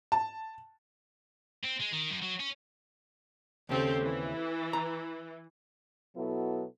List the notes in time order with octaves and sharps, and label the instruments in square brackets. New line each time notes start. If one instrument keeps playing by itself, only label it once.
[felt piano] A5
[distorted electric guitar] C4
G#3
D#3
F#2
F#3
C#4
[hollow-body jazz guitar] D#2 C#3 [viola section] C4 G4 A4
[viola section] E3
[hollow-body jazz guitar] A#5
[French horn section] B2 F#3 B3 E4 F#4 A4